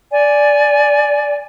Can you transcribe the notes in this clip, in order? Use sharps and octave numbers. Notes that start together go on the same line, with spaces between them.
D5 G#5